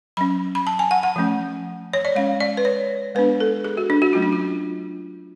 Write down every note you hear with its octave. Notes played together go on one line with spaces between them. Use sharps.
F#3 C#4 B5
B5
A5
G#5
F#5
F#5
F3 A3 C#4
C#5
D5
G#3 C#4 F5
D5
B4
C#5
G#3 B3 D4 B4
A4
G#4
F#4
D4
F#4
F#3 A3 C#4 F4
D4
F4